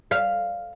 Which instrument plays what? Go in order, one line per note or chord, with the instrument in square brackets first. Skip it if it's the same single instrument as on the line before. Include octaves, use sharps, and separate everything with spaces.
[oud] F5